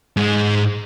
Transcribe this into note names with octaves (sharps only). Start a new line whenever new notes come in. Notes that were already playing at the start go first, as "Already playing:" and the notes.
G#2 G#3